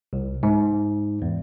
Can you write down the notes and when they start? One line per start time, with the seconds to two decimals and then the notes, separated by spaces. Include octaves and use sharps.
0.13 C2
0.43 G#2
1.22 E2